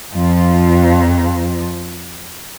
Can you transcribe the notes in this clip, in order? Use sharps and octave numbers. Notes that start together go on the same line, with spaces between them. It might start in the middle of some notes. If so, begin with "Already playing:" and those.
F2 F3